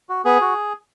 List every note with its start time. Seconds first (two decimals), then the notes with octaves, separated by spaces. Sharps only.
0.09 F#4
0.25 B3 G#4
0.41 F#4